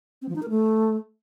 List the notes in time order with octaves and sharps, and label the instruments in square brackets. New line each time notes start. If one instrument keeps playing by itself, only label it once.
[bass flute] C4
F3
D#4
A#4
A3